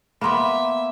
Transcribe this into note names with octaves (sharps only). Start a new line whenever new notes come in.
A#3 B3 E5 B5 C6